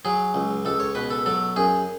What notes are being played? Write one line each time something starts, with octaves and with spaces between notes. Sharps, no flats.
F#3 G#4
C#2
C#2 A4
C#5
B2 B4
A4
F#3 A4
F#2 G#4